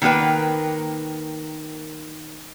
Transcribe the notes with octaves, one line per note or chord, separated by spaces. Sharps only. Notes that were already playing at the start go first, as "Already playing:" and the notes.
D#3 A#3 E4 B4 G5